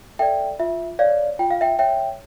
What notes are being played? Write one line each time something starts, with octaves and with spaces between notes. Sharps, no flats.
A4 D5 E5 G5
F4 E5
C#5 D5 F5
F4 G5
F5
E5 G5
C#5 E5 G5